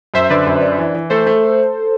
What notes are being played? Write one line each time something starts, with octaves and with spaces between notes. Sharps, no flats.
F#2 C5 E5
D3 B4 D5
F#2
D4
E3
E3
A3 A4 C5
A3